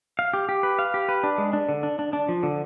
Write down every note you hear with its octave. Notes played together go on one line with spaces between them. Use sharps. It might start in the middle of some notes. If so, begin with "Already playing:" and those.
F5
G4
G4
B4
F5
G4
B4
D4
G#3
D4
D3
D4
D4
D4
F3
D3